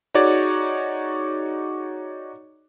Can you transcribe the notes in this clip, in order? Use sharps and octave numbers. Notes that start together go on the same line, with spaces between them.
D#4 F#4 G#4 C#5 D5